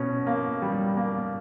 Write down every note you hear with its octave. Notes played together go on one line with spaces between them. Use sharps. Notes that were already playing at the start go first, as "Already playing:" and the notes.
Already playing: B2 C#4
A#3
G3
A#3